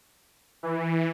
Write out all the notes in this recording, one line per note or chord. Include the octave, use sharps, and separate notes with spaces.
E3